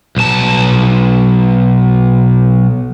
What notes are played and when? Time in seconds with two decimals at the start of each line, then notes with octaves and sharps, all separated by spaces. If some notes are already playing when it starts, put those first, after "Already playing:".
0.16 B1 A5